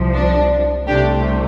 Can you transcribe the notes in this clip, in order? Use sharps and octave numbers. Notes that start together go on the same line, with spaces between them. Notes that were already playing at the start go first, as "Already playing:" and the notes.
Already playing: C2 C3 F3
D4
C2 C3 A3 D4 G4